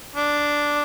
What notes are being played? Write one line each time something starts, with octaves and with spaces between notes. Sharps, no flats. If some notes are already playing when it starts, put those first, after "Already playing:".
D4